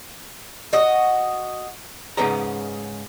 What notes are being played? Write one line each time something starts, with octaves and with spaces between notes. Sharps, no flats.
F#4 D#5
G#2 C#3 B3 C#4 A#5